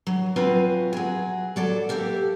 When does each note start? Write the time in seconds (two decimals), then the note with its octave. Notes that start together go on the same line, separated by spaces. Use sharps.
0.07 F#3
0.36 F#3 C4 F4 B4 G#5
0.93 F#3 G#4
1.56 F#3 A4 D5
1.89 A#3 G4 A4 E5